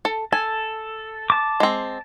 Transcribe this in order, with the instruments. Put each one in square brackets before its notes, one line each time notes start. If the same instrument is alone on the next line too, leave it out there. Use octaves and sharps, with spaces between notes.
[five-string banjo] A4
[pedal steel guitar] A4 [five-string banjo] G#5
[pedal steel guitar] A5 D6
[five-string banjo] G#3 C4